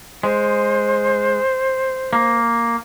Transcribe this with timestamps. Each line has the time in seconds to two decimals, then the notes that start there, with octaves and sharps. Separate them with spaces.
0.23 G#3 C5
2.13 A#3